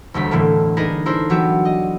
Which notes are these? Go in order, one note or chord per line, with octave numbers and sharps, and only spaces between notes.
E1 D2 G3 B6
A2 D3 E3 A3 A#3
D4 D#4 G#4 A#4 B4
D4 E4 A4 A#4 C5
E3 F#3 B3 F#4 G4 E5
D#5